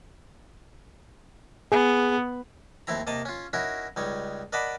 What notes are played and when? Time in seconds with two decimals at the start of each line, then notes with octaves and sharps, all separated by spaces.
1.72 B3 G#4
2.87 D#2 A3 C4 E4 A#5
3.07 C3 A#3 D#5 A5 A#5 D#6
3.25 C#4 F4
3.53 C#4 D#4 E4 F#4 A#4
3.96 C#2 G3 D#4 C#5
4.53 A#4 D5 D#5 F#5 A5 B5